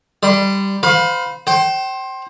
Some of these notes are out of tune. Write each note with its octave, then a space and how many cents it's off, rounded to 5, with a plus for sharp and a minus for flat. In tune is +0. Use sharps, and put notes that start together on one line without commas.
G3 +0 C6 -30
C5 -30 F5 +25 B5 -15
C5 +20 G5 -30